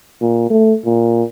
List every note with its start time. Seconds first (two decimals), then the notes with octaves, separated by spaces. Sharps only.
0.21 A#2
0.50 A3
0.85 A#2